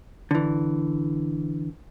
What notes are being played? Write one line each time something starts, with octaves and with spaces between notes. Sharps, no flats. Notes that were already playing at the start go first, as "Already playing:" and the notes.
D3 E3